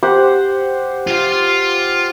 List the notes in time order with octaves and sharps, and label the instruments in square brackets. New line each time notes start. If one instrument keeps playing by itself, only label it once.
[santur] G4 C5 F#5
[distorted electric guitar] F4 F5